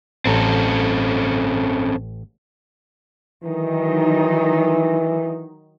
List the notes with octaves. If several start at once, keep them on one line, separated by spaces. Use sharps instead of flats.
A1 C4 C#4 A4 A#5
D#3 E3 F#3 D#4